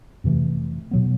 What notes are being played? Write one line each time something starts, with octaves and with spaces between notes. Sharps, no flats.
F2 C3 E3 A3
B2 F#3 B3